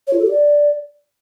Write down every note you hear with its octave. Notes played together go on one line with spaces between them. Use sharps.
C#5
F4
A4
G4
D5